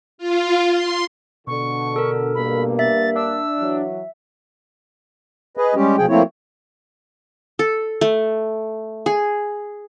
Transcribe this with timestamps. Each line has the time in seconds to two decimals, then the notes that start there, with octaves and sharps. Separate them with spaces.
0.18 F4
0.69 C6
1.47 B2 D3 C#6
1.96 A4 A#4
2.35 G2 A#3 B5
2.79 E5 A6
3.16 D4 E6
3.59 E3 F#3
5.57 G#4 B4 D#5
5.75 G3 G#3 C#4 G4
5.98 B2 F3 G#4 G5
6.09 F3 A3 A#3 C4 E4 C#5
7.59 A4
8.01 A3
9.06 G#4